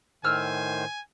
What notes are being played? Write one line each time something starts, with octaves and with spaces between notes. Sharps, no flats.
A2 D#3 C5 G#5 E6 F6